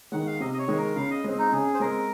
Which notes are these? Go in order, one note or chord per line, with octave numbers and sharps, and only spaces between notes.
D#3 G#3 F#5
F5
C3 D#5
D#5
C#5
D#3 G#3
A#4
C#3 F5
D#5
G#3 C4
D#4
C#3 G#4
C5
G#3 C4 A#4